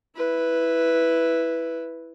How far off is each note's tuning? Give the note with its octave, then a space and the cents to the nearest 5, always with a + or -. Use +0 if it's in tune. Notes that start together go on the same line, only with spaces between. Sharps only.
E4 +0 B4 +0